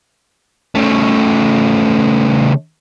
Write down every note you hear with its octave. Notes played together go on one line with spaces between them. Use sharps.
C#3 A3